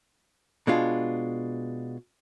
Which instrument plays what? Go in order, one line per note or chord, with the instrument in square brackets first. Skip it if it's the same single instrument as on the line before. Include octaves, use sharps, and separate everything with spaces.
[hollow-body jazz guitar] B2 G#3 D4 F4